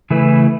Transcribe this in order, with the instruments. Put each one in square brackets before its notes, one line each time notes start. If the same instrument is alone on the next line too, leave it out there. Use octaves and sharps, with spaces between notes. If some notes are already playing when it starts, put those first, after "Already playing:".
[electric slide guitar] C#3 E3 A3 E4 B4